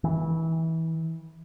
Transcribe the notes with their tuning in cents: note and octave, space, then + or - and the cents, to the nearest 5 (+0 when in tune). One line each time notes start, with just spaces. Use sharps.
E3 -25